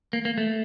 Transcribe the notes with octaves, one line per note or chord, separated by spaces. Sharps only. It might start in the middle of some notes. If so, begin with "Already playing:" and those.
A#3
A#3
A3